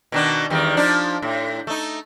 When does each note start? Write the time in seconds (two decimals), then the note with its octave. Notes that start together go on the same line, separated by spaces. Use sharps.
0.12 B2 D#3 D4
0.50 E2 D#3 G3
0.77 F3 D4 D#4
1.22 A2
1.67 A3 D#4